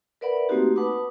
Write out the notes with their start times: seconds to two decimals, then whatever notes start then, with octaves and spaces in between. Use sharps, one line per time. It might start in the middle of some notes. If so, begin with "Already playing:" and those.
0.21 A#4 B4 D5 E5 F#5 B5
0.49 A3 A#3 C4 D#4 F#4 G4
0.76 B4 F#5 A5 B5 D6 D#6